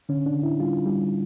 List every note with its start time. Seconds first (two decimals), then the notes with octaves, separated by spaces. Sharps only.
0.09 D3 C#4
0.26 D4
0.35 D3
0.43 E4
0.60 G3 F4
0.85 G3